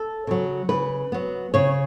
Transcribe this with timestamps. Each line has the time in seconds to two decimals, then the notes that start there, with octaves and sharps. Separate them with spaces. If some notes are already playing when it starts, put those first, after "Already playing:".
Already playing: A4
0.27 C#3 F#3
0.69 C#3 B4
1.12 F#3 B3
1.54 C#3 C#5